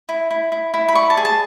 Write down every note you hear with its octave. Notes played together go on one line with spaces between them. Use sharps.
E4
E4
E4
E4
B5
D5 C#6
A5
G#4
A5